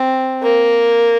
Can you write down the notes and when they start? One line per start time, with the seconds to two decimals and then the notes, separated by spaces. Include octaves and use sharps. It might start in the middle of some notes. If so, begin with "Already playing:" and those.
Already playing: C4
0.43 A#3